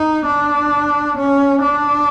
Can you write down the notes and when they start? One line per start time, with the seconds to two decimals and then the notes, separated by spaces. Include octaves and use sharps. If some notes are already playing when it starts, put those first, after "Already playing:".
Already playing: D#4
0.26 D4
1.17 C#4
1.62 D4